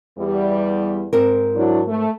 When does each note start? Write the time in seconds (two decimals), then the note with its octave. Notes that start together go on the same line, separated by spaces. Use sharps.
0.17 E2 G3
1.13 G#2 C4 A#4
1.55 F#3 D4 E4
1.87 A3